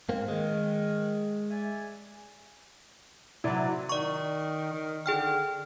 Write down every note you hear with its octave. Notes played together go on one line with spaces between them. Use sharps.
G#2 A#3 C4
D#3 G#3
D5 E5 G#5
C3 F#3 E4 D5
D#3 D5 C#6
D#3
D3 G#4 G5 F6